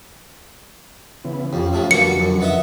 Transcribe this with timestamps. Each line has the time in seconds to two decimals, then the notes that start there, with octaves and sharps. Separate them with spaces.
1.24 C#3 E3 B3
1.53 F2 C#4 F4 G4
1.73 F2 A2 F3
1.91 F2 B2 D3 F#3 G3 A#3 C#7
2.20 F#2
2.41 B3 D#5 E5